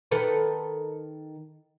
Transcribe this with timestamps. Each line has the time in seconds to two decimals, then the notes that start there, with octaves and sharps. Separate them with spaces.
0.11 D#3 A4 B4